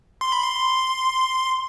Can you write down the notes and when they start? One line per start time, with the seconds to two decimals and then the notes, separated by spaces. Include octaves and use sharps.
0.21 C6
0.32 B5
0.43 C6